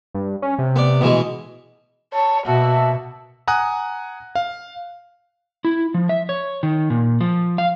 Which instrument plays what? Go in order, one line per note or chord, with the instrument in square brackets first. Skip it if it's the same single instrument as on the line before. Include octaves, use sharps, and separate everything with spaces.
[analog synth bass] G2
C#4
C3
[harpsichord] B3 D5
B2 E3 G#3
[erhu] C#5 [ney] A5
[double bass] B2 [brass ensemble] A#3 E5 [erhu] F#4 [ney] A5
[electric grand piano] F#5 G#5 A#5 D#6 F#6
F5
[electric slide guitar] E4
F3
E5
C#5
D#3
A#2
F3
F5